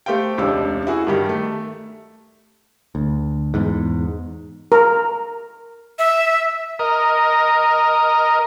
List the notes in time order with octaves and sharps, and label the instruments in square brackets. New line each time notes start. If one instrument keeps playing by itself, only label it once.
[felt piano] A3 G4 C5 F5 G5
E1 C#2 C3 D4 E6
E4 F#4 G#4
G2 D#3 G4
A3
[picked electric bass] D2
E2 G#2
[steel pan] A#4
[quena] E5
[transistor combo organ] A#4 D#5